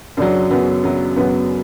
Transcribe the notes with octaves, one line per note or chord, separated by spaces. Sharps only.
F#2 C#3 F#3 D4
F#2 C#3 F#3 B3
F#2 C#3 F#3
F#2 C#3 F#3 B3